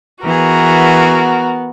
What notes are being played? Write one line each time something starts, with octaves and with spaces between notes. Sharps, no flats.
E3 B3 F#4 G#4 A#4